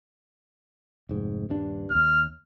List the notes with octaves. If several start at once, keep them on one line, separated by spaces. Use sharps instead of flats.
F1 G#2
D#1 G2 D4
D1 D#2 F6